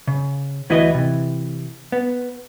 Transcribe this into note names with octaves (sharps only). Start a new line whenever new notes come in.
C#3
D2 E3 E4 F#4 B4 D#5
C3 E3
B3